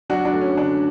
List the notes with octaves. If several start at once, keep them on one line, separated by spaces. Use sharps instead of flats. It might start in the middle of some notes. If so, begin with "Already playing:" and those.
F#3 D4 F#4
D4
A3
C#4
D3 D4